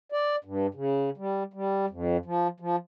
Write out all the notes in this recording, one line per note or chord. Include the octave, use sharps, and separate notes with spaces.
D5
G2
C#3
G3
G3
F2
F3
F3